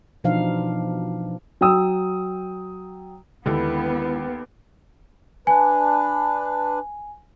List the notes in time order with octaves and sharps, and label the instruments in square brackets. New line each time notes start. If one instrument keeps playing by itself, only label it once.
[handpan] B2 E3 F3 D4 D#4 F5
[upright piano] F#3 G5 D#6 E6
[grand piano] D#2 A4 [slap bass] D3 D#3 G#3 [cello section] B3 [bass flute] E4
[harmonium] D4 B4 [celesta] G#5